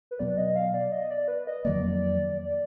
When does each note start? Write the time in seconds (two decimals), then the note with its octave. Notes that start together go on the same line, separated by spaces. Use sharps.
0.11 B4
0.19 B2 F#3 B3 D5
0.37 D#5
0.56 F5
0.74 D5
0.92 D#5
1.10 D5
1.28 B4
1.47 D#5
1.65 F2 D#3 F#3 A#3 D5
2.38 D5